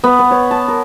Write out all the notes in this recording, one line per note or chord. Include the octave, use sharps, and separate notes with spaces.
B3
B3
C#5
A5
A#4